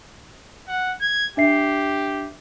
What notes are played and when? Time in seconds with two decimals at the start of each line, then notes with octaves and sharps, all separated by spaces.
0.68 F#5
1.01 G#6
1.37 D4 G4 E5 C7